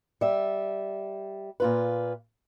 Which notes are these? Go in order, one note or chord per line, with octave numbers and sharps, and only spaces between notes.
G3 E5
A#2 F4 B4